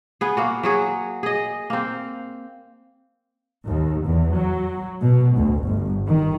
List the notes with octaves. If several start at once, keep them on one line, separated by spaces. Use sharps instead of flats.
B3 G#4
A#3 F#4
F#3 F#4 G#4
G#4 D#5
A#3 C4
D#2
E2
F#3
B2
D2
G1
D#3